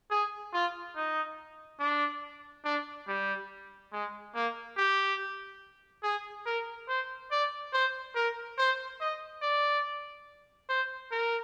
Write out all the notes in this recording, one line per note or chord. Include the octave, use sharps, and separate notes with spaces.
G#4
F4
D#4
D4
D4
G3
G#3
A#3
G4
G#4
A#4
C5
D5
C5
A#4
C5
D#5
D5
C5
A#4